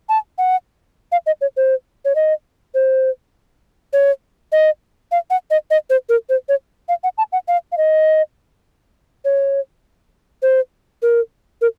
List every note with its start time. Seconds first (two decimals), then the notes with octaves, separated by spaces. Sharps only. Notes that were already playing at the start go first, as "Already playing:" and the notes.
0.09 A5
0.38 F#5
1.12 F5
1.26 D#5
1.41 C#5
1.57 C5
2.05 C#5
2.15 D#5
2.74 C5
3.93 C#5
4.52 D#5
5.12 F5
5.30 F#5
5.50 D#5
5.70 D#5
5.90 C5
6.09 A#4
6.29 C5
6.49 C#5
6.89 F5
7.04 F#5
7.18 A5
7.32 F#5
7.48 F5
7.72 F5
7.77 D#5
9.25 C#5
10.42 C5
11.02 A#4
11.61 A#4